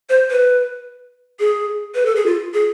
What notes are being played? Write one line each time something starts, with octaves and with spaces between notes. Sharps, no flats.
C5
B4
G#4
B4
A4
G#4
F4
G#4